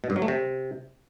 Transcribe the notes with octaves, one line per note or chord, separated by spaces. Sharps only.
B2
G2
F#3
A3
C3